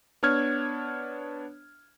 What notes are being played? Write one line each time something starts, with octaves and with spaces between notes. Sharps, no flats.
B3 D4 C#5 F6 G#6